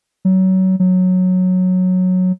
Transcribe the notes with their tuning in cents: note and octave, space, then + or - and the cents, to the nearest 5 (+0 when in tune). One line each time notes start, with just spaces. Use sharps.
F#3 +25
F#3 -10